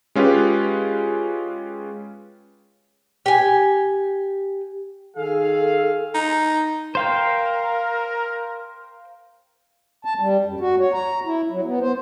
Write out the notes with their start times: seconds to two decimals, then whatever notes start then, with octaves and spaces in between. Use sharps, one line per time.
0.15 G#3 C#4 F4 G4 B4
3.26 G4 G#5
5.17 D#3 G#4 A4 F5
6.14 D#4
6.95 A#4 C5 F5 G5
10.05 A5
10.19 G3
10.45 F#2
10.60 F#4
10.80 C#5
10.93 A#5
11.26 E4
11.51 F#3
11.65 B3
11.80 C5